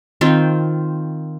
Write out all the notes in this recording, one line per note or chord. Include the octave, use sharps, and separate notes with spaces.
D#3 C4 F4